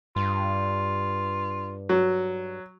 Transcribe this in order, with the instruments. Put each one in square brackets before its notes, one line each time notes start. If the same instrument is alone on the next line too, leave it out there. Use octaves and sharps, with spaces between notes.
[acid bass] G2 [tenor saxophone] F4
[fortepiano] F#3